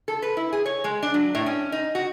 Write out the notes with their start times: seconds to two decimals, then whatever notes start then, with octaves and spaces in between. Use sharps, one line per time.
0.08 A4
0.22 B4
0.37 E4
0.53 G#4
0.66 C#5
0.84 G#3
1.03 D4
1.14 F#3
1.35 A2
1.46 C#4
1.72 D#4
1.95 F#4